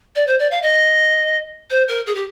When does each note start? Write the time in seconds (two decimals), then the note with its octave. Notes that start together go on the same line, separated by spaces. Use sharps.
0.15 D5
0.27 C5
0.39 D5
0.51 F5
0.62 D#5
1.70 C5
1.88 A#4
2.06 G#4
2.15 G4